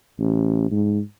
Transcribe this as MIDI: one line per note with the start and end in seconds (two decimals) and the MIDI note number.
0.19 0.68 33
0.71 0.99 44